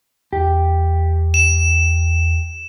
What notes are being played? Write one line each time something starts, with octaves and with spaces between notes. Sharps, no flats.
E2 G4
E7